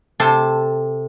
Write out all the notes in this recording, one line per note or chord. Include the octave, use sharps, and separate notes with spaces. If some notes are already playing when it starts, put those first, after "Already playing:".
C3 A4 C5 A5